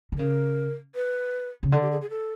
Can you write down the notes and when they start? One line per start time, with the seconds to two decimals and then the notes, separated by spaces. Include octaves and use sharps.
0.12 D3
0.18 C#3 A#4
0.95 B4
1.63 C#3
1.72 D3 A4
1.82 G4
1.91 G#4
2.01 G#4
2.10 A4